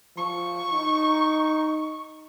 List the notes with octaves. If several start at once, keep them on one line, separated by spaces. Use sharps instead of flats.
F3 C#6
D#4